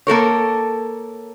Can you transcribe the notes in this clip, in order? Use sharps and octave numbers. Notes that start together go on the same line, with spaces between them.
A#3 A4 A#4 C#5